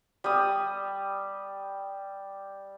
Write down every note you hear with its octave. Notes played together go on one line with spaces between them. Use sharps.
G3 D#6